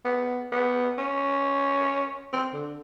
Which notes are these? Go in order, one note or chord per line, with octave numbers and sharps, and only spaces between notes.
B3
B3
C#4
C4
D3